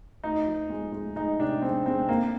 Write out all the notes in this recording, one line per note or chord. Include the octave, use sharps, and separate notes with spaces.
D2 D#4
F3
G#3
G#3
G#3 D#4
C3 D4
G#3 C4
G#3 C4
F2 A#3